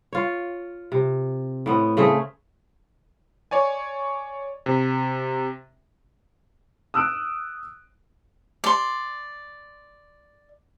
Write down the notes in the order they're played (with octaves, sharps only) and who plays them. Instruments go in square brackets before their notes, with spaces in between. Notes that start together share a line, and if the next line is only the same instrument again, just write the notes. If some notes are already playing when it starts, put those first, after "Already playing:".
[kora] F4 C#5
C3
A2 B3 C4
C#3 A3 C4 G#4
[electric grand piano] C#5 D5 G#5
C3
[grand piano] D#6 E6 F#6 D7
[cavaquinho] D5 C6